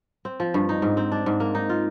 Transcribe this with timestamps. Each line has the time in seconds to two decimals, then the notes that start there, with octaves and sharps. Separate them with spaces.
0.25 C4
0.40 F3
0.54 G2
0.69 D#4
0.82 G#2
0.97 C4
1.12 D4
1.26 G#2
1.40 A#3
1.55 D#4
1.69 F4